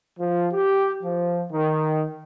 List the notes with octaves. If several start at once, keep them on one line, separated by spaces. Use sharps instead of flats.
F3
G4
F3
D#3